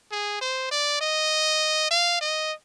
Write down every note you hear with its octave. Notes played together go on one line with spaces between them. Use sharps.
G#4
C5
D5
D#5
F5
D#5